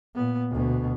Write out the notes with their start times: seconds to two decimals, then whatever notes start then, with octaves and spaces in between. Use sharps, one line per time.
0.15 A#2 B3
0.51 D2 B2